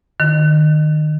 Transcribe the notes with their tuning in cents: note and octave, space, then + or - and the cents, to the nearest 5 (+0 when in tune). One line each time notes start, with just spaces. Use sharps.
D#3 -30